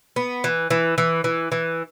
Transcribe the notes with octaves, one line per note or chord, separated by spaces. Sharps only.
B3
E3
E3
E3
E3
E3